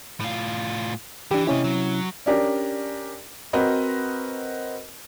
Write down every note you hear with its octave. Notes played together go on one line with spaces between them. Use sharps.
A2 F4
E3 D4 G4
C3 C#4 E4 G4 D#5
F#3
C#4 D4 G4 A#4 D5
C4 F#4 A#4 B4 D#5